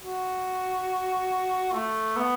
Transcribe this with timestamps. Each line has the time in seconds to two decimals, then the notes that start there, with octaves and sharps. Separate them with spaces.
0.03 F#4
1.73 A3
2.16 B3